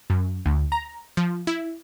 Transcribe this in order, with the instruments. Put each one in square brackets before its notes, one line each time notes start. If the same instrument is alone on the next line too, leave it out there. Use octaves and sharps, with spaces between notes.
[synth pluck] F#2
D2
A#5
F3
E4